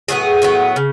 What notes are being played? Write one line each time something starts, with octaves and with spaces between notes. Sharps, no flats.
A2 F#3 B3 G#4
A2 F#3 B3
C#3